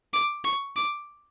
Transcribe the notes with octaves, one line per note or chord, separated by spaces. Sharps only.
D6
C#6
D6